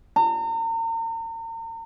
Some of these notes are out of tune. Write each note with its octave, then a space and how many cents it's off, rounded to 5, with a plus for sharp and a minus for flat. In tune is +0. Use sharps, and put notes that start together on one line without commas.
A#5 -40